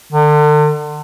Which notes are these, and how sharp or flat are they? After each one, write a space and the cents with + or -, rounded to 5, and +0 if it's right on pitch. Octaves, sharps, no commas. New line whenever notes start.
D3 +35